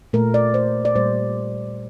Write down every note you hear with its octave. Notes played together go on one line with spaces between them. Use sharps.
A#2 A3 A#4
D5
C5
D5
A#2 G3 A#3 C5